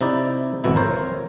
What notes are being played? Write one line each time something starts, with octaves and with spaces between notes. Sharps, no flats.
C3 D#4 E4 D5
G#1 F2 B2 E4
A#4 C5 C#5